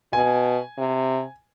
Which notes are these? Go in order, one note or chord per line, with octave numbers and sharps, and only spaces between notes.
B2 G#5
C3